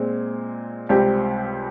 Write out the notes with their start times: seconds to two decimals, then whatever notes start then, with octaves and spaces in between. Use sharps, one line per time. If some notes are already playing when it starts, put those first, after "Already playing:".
Already playing: A#2 G#3 C4
0.89 C#2 C3 G3 C4 G4